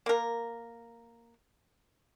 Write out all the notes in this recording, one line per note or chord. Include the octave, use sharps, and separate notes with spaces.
A#3 A#4